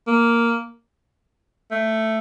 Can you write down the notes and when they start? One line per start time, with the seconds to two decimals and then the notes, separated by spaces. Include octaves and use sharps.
0.07 A#3
1.71 A3